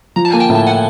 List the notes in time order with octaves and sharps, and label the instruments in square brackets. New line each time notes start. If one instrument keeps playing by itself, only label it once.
[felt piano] F3 [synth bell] A#5
[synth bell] A5
[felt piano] A#3 [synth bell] G#5
[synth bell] G5 A5
[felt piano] A2
[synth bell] A5
F#5 G#5